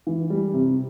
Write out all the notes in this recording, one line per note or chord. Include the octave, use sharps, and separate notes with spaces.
E3
G3
C3